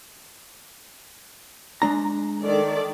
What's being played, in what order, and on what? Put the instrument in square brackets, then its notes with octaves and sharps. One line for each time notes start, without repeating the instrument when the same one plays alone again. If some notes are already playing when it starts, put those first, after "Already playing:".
[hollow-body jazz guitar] G#3 D4 A#5
[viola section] D#3 A4 D5